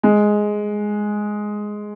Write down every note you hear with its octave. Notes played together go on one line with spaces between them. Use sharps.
G#3